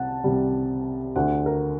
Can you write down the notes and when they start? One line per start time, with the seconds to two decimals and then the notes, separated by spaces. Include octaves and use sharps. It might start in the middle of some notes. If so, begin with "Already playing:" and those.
Already playing: C2 C3 F#5 A5
0.24 C2 C3 G3
1.16 D2 D3 A3 F#5
1.46 A#4